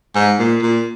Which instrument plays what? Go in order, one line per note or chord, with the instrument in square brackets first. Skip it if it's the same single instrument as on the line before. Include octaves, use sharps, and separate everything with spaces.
[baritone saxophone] G#2
A#2
A#2